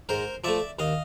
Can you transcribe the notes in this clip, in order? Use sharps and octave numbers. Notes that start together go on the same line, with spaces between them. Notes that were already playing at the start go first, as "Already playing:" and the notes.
G#2 A#4 C5
F3 A3 D5 E5
D#2 D#5 F5